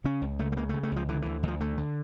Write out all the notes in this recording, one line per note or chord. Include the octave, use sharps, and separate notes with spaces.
C#3 C#4
C#2
C#2 A3
A3
C#3 A#3
C#3 A3
A3
C#2 F3
D3 E3
D2 E3
D2 F3
D3 A3
D3